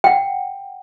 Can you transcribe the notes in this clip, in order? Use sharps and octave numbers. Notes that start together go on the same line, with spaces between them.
F#5 G5